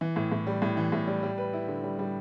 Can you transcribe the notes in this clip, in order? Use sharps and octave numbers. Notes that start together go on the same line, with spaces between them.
E3
A2
A2
G3
A2
E3
A2
G3
G3
B4
E4
D3
G3
G3